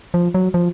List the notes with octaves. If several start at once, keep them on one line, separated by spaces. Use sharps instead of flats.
F3
F#3
F3